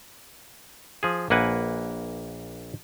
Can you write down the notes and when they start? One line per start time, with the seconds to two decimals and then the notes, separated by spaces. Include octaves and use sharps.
1.03 F3 G#4
1.30 A#1 A#3 B4 F#5 G#5